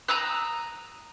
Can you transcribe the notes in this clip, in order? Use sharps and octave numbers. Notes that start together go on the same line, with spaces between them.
A#5 D#6 E6 F#6